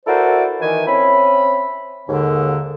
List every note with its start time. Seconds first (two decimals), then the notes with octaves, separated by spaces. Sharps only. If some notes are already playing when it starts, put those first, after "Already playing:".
0.06 E4 F#4 A4 A#4 C5 D5
0.61 D#3 E3 G#5
0.87 C4 C#4 E5 B5
2.08 D#2 G#2 D3